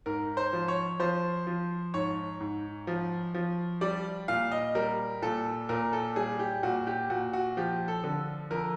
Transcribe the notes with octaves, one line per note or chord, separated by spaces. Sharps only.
G#2 A#4
C5
F3
C#5
F3 C5
F3
G#2 C#5
G#2
F3
F3
G3 D5
A#2 F5
D#5
G3 A#4
A#2 A4
A#2 A#4
A4
G3 G#4
G4
A#2 F#4
G4
A#2 F#4
F#4
F3 G4
A4
D3
F2 A#4